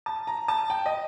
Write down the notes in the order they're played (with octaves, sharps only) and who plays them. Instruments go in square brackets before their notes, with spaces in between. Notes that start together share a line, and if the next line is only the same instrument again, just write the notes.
[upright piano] A5
A#5
A5
G5
D#5